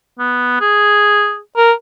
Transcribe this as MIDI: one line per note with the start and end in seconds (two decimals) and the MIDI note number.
0.19 0.58 59
0.61 1.39 68
1.57 1.72 70